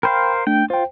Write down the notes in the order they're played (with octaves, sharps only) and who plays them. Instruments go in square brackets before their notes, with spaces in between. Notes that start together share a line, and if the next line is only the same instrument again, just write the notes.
[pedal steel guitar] A#4 C5 F5 [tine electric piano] G5 B5
[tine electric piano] A3 D4 [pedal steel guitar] G5
[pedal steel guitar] F4 [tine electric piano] C5 G5